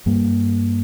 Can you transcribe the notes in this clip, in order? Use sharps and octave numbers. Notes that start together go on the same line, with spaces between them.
G2 G3 A#3